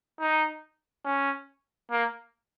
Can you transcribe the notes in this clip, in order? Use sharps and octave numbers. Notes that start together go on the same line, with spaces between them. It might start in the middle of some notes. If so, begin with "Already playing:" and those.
D#4
C#4
A#3